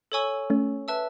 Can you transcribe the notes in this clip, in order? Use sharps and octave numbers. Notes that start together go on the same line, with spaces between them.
A4 C#5 G#5 C#6 E6
A3 C#4
B4 E5 A5 E6